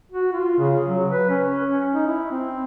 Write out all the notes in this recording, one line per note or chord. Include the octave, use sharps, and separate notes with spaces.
F#4
F4
C#3
F#3
B4
C#4
D#4
E4
C4